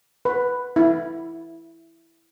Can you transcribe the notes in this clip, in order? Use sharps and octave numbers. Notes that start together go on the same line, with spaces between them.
B4
E4